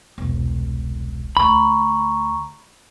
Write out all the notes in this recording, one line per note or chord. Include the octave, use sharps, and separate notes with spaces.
E1 C2
D2 A#5 B5 C#6